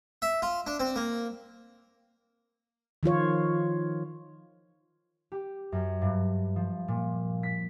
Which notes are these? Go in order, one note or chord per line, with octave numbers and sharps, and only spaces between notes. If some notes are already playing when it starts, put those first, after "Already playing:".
E5
F4
D4
C4
A#3
D#3 F3 F4 C#5
G4
F#2
G2
F3
A#2
B6